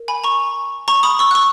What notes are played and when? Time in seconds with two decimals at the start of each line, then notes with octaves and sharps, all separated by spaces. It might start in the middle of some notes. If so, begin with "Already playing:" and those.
Already playing: A#4
0.08 G#5 B5
0.24 A#5 C#6
0.88 A#5 C#6
1.03 B5 D#6
1.19 C#6 E6
1.31 F#6
1.35 C#6 E6